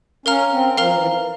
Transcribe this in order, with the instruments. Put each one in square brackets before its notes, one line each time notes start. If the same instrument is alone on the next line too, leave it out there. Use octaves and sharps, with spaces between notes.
[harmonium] C#4 [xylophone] A#4 F5 A#5 F6
[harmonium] C4
[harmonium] F3 [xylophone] A#4 F5 A#5 F6
[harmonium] E3